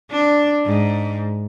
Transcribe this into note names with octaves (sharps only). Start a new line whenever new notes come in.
D4
G#2